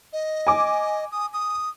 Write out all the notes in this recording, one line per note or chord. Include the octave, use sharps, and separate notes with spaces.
D#5
G#5 D6
D#6
D#6